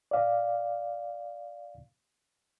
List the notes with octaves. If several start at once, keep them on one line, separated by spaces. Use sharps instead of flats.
D5 F5